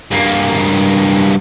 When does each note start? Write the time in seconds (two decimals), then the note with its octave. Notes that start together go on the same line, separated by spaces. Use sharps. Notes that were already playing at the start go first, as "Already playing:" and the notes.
0.11 G2 A#3